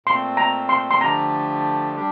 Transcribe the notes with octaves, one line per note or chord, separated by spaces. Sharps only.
A#2 A3 C4 C6
A#5
C6
C6
D3 F3 A3 D4 G4 A#5
G3 D4 G4